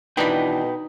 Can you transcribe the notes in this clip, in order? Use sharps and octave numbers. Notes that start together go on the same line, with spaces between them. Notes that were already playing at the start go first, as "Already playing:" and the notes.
B2 D#3 E3 D4 D#4 B4 G5 B5